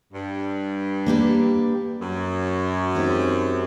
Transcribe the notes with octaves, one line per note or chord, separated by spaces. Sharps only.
G2
A#3 D4 G4 B4
F#2
G#3 C4 D#4 G4